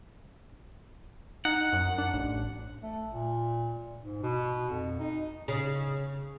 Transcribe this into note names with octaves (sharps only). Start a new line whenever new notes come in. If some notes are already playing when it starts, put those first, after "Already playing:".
D#4 F#5
F#2
D4
A1
A3
A#2
G#2
B2
F2
D#4
C#3